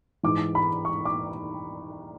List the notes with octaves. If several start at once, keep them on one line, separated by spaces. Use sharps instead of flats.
G#2 E3 D6
B5
C#6
D6